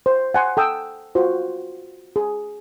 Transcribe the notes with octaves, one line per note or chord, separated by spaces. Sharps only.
C5
F#5 G#5 C6
A4 G5 D#6 E6
F4 F#4 C5
G#4